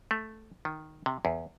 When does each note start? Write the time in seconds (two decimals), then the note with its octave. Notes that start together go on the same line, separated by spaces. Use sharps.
0.11 A3
0.65 D#3
1.06 C3
1.25 E2